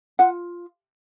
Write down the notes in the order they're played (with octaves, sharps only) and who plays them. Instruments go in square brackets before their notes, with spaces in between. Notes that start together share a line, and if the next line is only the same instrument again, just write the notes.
[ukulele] F4 F#5